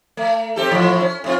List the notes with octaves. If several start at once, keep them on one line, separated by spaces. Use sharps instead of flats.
A3
C4 G4 A4
A2 E3 F3
C#4
A2 C4 F4